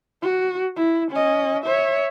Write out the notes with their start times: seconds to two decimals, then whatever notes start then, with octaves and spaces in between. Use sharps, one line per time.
0.22 F#4
0.76 E4
1.11 C#4 D#5
1.64 C#5 E5